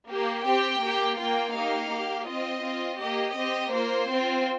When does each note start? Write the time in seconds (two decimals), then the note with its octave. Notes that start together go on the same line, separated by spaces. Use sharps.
0.09 A#3 G4
0.45 C4 G4 G5
0.82 A#3 G4
1.18 A#3 F4 G5
1.54 A#3 D#4 G4 F5
1.91 A#3 G4
2.27 C4 F4 D#5
2.64 C4 F4
3.00 A#3 G4 D#5
3.36 C4 G4 D#5
3.73 A#3 F4 C5
4.10 C4 F4